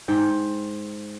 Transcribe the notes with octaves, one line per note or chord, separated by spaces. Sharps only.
G#2 G5